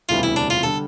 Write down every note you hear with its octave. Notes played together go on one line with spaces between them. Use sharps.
E1 D2 C3 E3 G3 F4
E4
D4
F4
D3 G3 A4